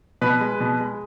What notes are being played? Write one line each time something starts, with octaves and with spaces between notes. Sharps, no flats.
B2 B4
G#3
B2
G#3